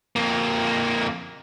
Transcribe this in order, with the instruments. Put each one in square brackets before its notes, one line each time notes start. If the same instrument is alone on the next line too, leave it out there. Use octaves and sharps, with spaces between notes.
[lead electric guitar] F2 A#3